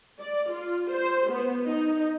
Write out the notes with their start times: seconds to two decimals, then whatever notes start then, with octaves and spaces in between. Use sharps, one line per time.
0.20 D5
0.51 F4
0.91 C5
1.29 B3
1.66 D#4